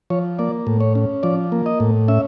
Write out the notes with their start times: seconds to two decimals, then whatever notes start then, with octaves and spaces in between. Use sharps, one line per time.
0.10 F3 C#5
0.39 A#3 D5
0.67 A2
0.80 C#5
0.95 C#4
1.23 F3 D5
1.52 A#3
1.66 D#5
1.80 A2
2.08 C#4 E5